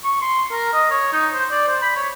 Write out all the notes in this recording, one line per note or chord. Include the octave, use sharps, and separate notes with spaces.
C#6
C6
A#4
D#5
C#5
D#4
C5
D5
C5
B5
C#5